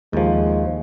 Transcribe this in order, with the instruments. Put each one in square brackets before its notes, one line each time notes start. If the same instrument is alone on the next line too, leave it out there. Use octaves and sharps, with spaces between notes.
[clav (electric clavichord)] D#2 F3 [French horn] G#3